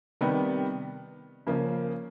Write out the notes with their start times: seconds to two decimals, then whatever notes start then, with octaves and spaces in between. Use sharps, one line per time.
0.21 C3 D#3 G3 B3
1.47 C#3 F3 A#3 C#4